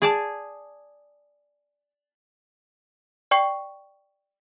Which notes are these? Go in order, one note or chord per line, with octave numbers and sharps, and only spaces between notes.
G#4 D5 A5
D5 G5 C#6 C7